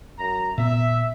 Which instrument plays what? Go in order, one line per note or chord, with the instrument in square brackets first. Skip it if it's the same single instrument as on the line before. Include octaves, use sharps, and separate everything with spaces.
[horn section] F#2 A#5
[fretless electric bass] A#2 B3 [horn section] E5